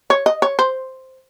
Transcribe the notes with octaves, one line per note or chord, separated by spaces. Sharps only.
C#5
D#5
C#5
C5